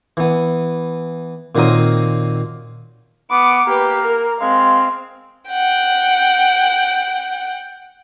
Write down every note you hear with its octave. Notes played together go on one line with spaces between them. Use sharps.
E3 B3
A#2 D#3 F#3 C4 A#4 D#6
B3 D6
A#3 G4 B4
A#4
G#3 C4 F5
F#5 G5